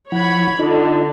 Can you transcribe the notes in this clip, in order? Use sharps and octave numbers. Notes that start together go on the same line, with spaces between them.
F3 E4 C#5 F#5 B5 G#6
D3 D#4 F4 D#5